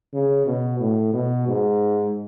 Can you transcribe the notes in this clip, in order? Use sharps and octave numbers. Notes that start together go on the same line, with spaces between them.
C#3
B2
A2
B2
G#2